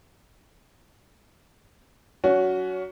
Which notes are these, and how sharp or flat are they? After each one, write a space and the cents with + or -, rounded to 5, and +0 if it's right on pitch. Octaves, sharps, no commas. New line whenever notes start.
F#3 +0 C#4 +25 F#4 +0